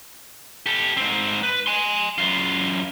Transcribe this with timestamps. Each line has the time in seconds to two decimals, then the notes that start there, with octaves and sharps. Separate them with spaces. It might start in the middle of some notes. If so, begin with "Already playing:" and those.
0.66 G4 A4
0.97 G#2 C4
1.43 B4
1.67 G#5 C6
2.18 F#2 F4